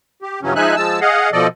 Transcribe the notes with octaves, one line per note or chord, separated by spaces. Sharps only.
G4
G2 C#3 E3 F#3 C#4
F3 G#3 D#4 E5 G#5 F#6
F3 G#3 A5 E6
G#4 D#5 F5 F#5
B2 F3 A4 D5 D#5